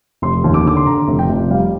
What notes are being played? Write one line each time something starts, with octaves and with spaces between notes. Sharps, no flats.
F1 C6
D#2
D6
D3 D6
C6
D3 A#5
F1
G5
F1
G3 F5